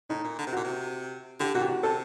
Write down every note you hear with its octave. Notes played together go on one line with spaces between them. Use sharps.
A2 D#4
A#2
D3
C3
A#2 F#4
C3
D3 G4
A#2 F#4
G4
F#4
C3 A4